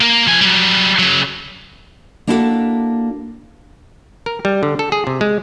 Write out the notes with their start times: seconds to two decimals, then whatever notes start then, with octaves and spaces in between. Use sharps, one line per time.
0.01 A#3 A#4
0.27 F3 G#5
0.41 F#3 G3
0.99 C#3 F#3
2.27 A#3 D4 E4 F#4 G4 A4
4.26 A#4
4.45 G3
4.63 D3
4.79 A4
4.92 G#4
5.07 C3
5.21 G#3